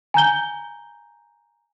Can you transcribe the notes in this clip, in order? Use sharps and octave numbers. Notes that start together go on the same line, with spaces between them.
G#5 A#5 G6 G7